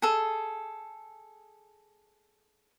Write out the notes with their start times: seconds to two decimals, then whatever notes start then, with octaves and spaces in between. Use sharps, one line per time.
0.02 G#4 A4